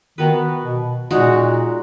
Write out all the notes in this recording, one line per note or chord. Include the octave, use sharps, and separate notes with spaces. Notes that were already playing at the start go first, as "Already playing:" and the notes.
D#3 B3 F#4 B4
B2
A#2 G#3 D#4 F#4